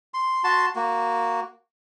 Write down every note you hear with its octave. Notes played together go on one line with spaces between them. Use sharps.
C6
F#4 A5 C6
A#3 F#4